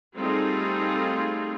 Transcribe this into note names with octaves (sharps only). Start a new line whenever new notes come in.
G3 A3 C4 D#4 F4 G#4